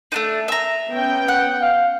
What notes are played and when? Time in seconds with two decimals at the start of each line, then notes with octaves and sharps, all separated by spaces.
0.12 A3 D4 D#4
0.48 E5 A#5
0.89 B3 C#4 G5
1.28 F#5
1.61 F5